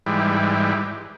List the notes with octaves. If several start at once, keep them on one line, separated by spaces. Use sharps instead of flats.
G#2 E3 G3